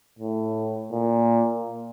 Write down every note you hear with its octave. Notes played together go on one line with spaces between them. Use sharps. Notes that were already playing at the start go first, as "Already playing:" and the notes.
A2
A#2